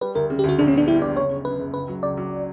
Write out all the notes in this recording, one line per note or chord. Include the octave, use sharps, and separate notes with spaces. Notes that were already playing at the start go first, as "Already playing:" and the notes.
G3 B4
D2 A#4
C#3
G4
D2 F#4
A#1 D4
C#4
B3 D4
G3 E4
A#1 D5
F#1 C#5
C#3
F#2 B4
F#1
C#2 B4
F#3
C#2 D5
F#3